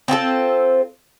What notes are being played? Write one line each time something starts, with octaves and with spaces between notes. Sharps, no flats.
C4 F4 G#4 A4